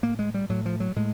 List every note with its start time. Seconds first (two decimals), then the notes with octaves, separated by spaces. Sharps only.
0.03 A2 A#3
0.19 G#3
0.34 G3
0.49 A2 F#3
0.66 F3
0.80 F#3
0.96 A2 G#3